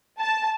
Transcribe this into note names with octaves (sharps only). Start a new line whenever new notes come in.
A5